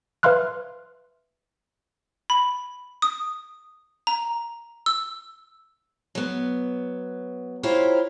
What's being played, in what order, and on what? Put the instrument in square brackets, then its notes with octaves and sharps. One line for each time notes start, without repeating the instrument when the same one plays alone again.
[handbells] B4 E5 F5 C6 F6 F#6
[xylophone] B5
D#6
A#5
E6
[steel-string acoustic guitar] F#3 B3
E4 F4 G4 C5 C#5 A#5